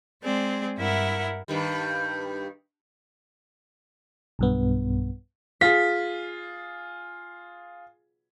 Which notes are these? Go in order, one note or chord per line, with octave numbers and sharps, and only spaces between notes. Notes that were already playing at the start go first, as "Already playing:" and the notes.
G#3 C4 G#4 D5
G2 E4 A#4 E5 F#5
G2 D#3 G3
B1 G2 B3
F4 G#4 B6